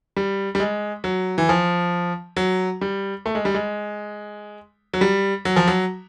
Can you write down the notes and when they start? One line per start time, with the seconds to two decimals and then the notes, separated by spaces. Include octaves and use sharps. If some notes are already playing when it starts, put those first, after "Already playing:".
0.17 G3
0.55 G3
0.60 G#3
1.04 F#3
1.38 E3
1.49 F3
2.37 F#3
2.81 G3
3.26 A3
3.35 G#3
3.45 G3
3.54 G#3
4.94 F#3
5.01 G3
5.45 F#3
5.56 F3
5.67 F#3